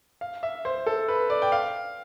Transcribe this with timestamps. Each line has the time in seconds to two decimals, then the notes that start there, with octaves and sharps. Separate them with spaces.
0.21 F5
0.43 E5
0.65 C5
0.87 A4
1.08 B4
1.30 D5
1.42 G5
1.52 F5